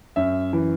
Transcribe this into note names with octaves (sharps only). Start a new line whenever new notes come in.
F#2 E5
E3